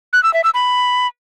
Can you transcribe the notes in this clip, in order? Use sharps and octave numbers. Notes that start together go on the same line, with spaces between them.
F#6
E6
E5
E6
B5